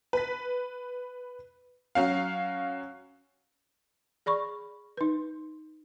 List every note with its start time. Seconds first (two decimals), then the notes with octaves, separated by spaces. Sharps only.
0.13 B4 B6
1.95 F#3 C#4 F5
4.26 G#4 D5 B5 C#6
4.97 D#4 B4